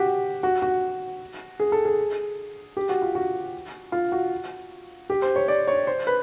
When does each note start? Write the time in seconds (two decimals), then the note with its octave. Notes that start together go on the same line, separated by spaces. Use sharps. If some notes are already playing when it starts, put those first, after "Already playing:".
Already playing: F#4 G4
0.43 F#4
0.62 F#4
1.60 G#4
1.72 A4
1.85 G#4
2.77 G4
2.89 F#4
3.02 F4
3.15 F#4
3.92 F4
4.12 F#4
5.10 G4
5.22 C5
5.36 C#5
5.48 D5
5.68 C#5
5.87 C5
6.07 B4